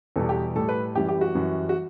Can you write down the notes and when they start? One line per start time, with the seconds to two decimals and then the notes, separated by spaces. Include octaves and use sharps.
0.16 E2 B2 G3 A4
0.29 G4
0.55 A2 G3 A4
0.69 B4
0.95 F#2 E3 G3 G4
1.09 G4
1.21 F#4
1.35 F#2 E3 G3
1.69 F#4